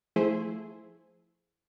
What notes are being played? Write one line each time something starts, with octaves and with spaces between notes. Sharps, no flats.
F3 A3 E4 G#4 C5